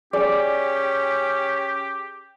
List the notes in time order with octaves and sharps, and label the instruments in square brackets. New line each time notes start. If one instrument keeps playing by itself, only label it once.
[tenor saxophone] C#4 [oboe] G4 [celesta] G#4 G#5 [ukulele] D5